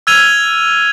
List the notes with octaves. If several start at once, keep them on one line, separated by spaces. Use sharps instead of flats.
E6 F6 G#6 D#7 F7 G7